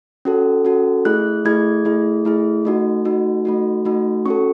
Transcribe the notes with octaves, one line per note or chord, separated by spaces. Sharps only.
C#4 F#4 A4
C#4 F#4 A4
A3 E4 G#4 F#6
A3 E4 G#4 G#6
A3 E4 G#4
A3 E4 G#4
A3 D#4 F#4
A3 D#4 F#4
A3 D#4 F#4
A3 D#4 F#4
C#4 F#4 A4 C#6